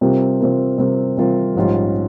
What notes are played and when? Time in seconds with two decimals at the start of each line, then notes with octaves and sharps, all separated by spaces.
0.01 C3 G3 C4 F4 A#4
0.40 C3 G3 C4 F4 A#4
0.78 C3 G3 C4 F4 A#4
1.17 C3 G3 C4 F4 A#4
1.56 A#1 G#2 G3 C#4 F4